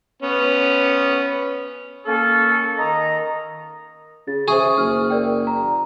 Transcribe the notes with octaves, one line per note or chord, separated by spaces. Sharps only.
B3 C#4
A#3 C#4 A4
D#3 D#5 A#5
C#3 A6
G#4 C5 E5 C#6
F#1 F6
A#4 D5 G5
A#5